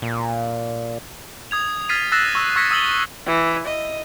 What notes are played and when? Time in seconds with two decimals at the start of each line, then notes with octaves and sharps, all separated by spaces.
0.02 A#2
1.51 D#6 G#6 F7
1.89 F6 G#6 A6 B6 C7 D#7
2.12 E6 F#6 A6 A#6 C7 E7
2.35 C#6 E6
2.56 C#6 E6 G#6 A#6 B6 C#7
2.71 D#6 E6 A6 F#7 G7
3.26 E3
3.67 D#5